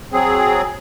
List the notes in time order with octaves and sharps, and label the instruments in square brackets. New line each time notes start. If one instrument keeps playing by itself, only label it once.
[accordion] F#3 C4 G#4